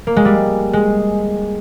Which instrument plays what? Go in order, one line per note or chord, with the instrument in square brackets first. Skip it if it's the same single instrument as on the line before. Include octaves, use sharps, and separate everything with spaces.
[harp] A#3
G#3
G3
G#3